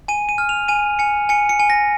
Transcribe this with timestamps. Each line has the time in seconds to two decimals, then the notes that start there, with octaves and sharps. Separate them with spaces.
0.08 G#5 D#7
0.29 D#7
0.38 F6
0.49 F7
0.68 G#5 D#7
0.99 G#5 C#7
1.29 G#5 C#7
1.49 C#7
1.59 G#5
1.70 A#6